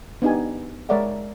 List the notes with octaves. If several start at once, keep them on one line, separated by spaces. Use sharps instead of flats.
B3 D4 D#4 G4 G#5
G#3 A#4 C#5 D5 E5 F#5